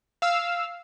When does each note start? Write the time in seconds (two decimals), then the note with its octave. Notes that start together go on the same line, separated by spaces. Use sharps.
0.22 F5 E6